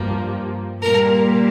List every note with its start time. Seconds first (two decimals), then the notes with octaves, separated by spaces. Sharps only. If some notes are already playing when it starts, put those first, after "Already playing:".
Already playing: G2 F3 A#3
0.82 A#2 G3 A#3 A#4